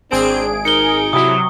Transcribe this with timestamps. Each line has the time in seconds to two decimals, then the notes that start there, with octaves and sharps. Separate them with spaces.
0.12 G#1 C4 D4 G#4 D7
0.65 D#4 A#4 C#7 G7
1.13 C3 F#3 E4 D#6